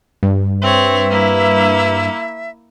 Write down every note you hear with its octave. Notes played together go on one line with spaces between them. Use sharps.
G2
C4 B4 C#5 E5
A#3 E4